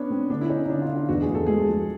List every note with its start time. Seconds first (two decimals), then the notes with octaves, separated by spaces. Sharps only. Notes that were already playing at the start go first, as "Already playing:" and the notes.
Already playing: B3 C#4 D4
0.10 C4
0.30 D3 D4
0.41 E4
0.49 C#4 D#4
0.65 D#4
0.69 D3 D4
0.82 F4
0.89 D3
0.96 F4
1.09 E2 F#4
1.22 G#4
1.28 E2
1.35 A4
1.47 G#3 G#4
1.60 A4
1.67 F3